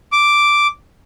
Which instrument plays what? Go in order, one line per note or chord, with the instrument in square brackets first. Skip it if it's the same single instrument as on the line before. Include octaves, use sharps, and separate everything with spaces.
[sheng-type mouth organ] D6